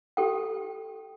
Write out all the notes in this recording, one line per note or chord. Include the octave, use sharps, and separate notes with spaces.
G4 A4 G5